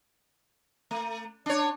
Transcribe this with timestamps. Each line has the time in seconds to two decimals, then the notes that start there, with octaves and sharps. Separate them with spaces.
0.91 A3
1.46 D4 C#5